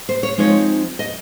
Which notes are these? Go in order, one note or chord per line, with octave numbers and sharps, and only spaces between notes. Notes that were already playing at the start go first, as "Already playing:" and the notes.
C5
C#5
F3 G#3 C4 D#4 C#5
D#5